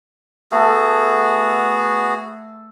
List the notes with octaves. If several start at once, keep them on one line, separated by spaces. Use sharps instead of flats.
A3 B3 F#4 G#4 A4